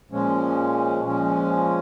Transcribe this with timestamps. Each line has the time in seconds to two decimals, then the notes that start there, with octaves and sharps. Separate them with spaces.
0.11 A#2 F3 G#3 C#4
1.03 A#2 F3 G#3 C#4